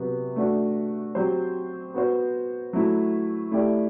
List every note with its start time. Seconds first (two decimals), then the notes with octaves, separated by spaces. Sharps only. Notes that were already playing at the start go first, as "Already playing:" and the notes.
Already playing: C3 F#3 B3
0.36 A3 D4 F#4
1.15 F#3 C4 G4 C5
1.94 B3 F#4 C5
2.73 F#3 A3 E4
3.52 A3 E4 G4 D5